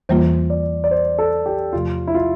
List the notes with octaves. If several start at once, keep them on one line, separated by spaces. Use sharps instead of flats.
E2 E3 G3 A#3 F4 C5
D5
D5
C5
A4
G4
E2 C3 F3 A3 F4
E4
F4